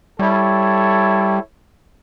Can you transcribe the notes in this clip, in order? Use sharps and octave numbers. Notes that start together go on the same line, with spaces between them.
G3 E4 A4 C#5